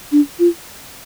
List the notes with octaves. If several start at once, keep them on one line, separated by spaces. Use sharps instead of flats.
D4
F4